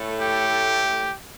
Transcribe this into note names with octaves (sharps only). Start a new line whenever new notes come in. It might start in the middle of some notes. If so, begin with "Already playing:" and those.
Already playing: A2 A3
G4